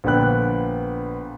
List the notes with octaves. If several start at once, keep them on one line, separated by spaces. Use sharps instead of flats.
A#1 D3 B3 G5 B5 F#6